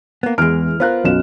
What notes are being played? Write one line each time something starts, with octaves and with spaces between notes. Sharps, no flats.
A#3 B3
E2 E3 G#3 F6 D7
B3 F4 A#4 C5 F#6
B1 F#2 E7